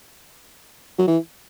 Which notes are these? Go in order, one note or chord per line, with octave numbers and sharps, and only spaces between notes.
F#3
E3